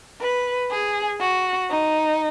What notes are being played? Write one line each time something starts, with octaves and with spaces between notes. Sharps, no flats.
B4
G#4
F#4
D#4